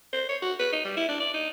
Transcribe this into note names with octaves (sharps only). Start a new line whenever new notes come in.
C5
C#5
F#4
B4
D#4
G3
E4
D4
D5
D#4